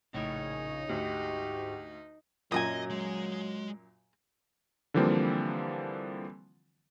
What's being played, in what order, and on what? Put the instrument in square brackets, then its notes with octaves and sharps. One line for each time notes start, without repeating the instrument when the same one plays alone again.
[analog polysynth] A#1 C#3 C#5 [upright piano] A2 [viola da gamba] D#4
[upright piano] D2 [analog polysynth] G#2 F#4 [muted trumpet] G4
[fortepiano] F#2 A#2 [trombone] F#3 [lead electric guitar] D#5 [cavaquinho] G#5 A#5 D#6
[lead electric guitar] G#3
[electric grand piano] D3 E3 F3 G3 A#3 C4